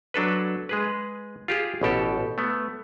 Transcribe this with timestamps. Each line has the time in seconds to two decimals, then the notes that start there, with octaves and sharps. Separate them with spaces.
0.14 F#3 D4 A4 B4
0.69 G#3 G#4 B4
1.48 F4 G4 G#4
1.81 A1 B2 G4 A4
2.38 A3 B3